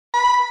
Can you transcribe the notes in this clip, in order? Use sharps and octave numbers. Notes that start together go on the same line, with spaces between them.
B5